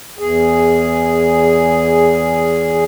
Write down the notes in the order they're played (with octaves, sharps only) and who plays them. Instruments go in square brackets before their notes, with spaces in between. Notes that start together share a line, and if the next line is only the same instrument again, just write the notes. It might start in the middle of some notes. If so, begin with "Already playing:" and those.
[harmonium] E2 G#4